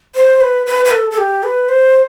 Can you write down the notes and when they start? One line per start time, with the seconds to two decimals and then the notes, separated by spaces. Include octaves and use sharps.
0.15 C5
0.41 B4
0.66 B4
0.85 B4
0.91 A4
1.11 A4
1.18 G4
1.43 B4
1.69 C5